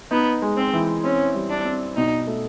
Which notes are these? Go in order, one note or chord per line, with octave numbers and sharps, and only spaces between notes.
B3 D#4
G#3
C4
E3
C4 C#4
G3
D4
C4
B2 D#4
A3